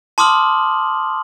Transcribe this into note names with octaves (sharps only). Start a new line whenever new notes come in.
A5 C6 D6 D#6 F6 F#7